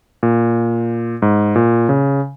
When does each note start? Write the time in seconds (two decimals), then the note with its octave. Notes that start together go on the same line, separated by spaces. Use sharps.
0.23 A#2
1.22 G#2
1.56 A#2
1.89 C#3